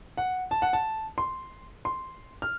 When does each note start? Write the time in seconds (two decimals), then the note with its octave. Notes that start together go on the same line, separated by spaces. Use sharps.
0.17 F#5
0.51 A5
0.62 F#5
0.73 A5
1.18 C6
1.85 C6
2.42 F6